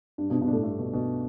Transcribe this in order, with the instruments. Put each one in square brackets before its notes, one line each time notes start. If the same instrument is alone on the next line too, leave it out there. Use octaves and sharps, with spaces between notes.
[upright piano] G2 [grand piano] D4
[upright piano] G2 B2
[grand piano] D4
[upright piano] G2 B2
[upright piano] A2 [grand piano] D4
[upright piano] G2 [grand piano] A3
[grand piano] B2
B2